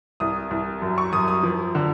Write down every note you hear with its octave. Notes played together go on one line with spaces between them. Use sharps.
C2 D#6
C2
F#2
C#6
F#2 D#6
D#6
F3
D3